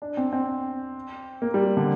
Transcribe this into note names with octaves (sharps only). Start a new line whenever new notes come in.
D4
C4
C4
A#3
G3
D3